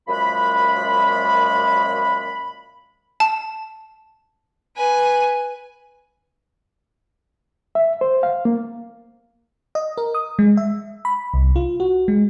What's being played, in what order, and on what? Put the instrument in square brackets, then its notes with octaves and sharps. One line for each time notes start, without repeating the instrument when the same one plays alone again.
[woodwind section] F#2 A#2 F3 G#3 B5
[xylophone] A5
[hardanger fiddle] B4 G#5
[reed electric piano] E5
C5
F5
A#3
[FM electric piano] D#5
A#4
D#6
G#3
E5
B5
C2
F4
F#4
G#3